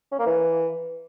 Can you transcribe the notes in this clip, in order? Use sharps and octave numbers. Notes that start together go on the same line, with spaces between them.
C#4
A#3
E3